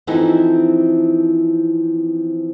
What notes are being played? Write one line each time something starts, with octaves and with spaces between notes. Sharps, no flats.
E3 F3 C4 D#4 E4 A4